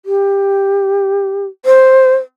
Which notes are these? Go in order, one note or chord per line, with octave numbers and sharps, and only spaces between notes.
G4
C5